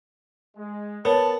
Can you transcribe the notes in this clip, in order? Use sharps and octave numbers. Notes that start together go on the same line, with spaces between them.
G#3
B3 A#4 C#5 A5